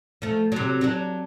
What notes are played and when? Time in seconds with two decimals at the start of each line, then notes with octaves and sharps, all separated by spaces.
0.22 F3 A3
0.52 C3 F#3
0.81 F#3 D4